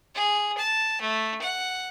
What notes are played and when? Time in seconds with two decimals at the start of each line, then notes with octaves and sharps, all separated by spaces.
0.15 G#4
0.57 A5
1.01 A3
1.42 F#5